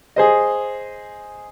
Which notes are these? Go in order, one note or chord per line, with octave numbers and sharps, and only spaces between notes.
G#4 C5 D#5